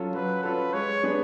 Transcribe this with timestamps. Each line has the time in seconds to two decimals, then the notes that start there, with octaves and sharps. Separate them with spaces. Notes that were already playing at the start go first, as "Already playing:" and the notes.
Already playing: F#3 C#4 F4 A4
0.14 F#3 B4
0.43 C#4 F4 A4 B4
0.74 G#3 C#5
1.03 B3 D4 G#4 B4